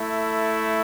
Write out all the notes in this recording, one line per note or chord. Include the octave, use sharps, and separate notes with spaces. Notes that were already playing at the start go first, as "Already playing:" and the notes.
Already playing: A3 E4